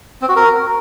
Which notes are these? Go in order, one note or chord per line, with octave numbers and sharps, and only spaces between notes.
C4
F#4
A#4